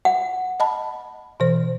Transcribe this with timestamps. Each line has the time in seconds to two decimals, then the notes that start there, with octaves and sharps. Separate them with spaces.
0.05 F#5
0.60 D#5 A5 B5
1.40 B2 E3 C5